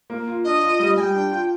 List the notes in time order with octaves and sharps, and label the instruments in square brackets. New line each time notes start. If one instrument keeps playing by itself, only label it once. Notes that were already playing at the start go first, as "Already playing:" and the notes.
[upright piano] A#3
F4
[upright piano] D4 [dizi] D#5
[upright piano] F4
G3
[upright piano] G3 [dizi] G#5
[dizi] G5
[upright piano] D4
F4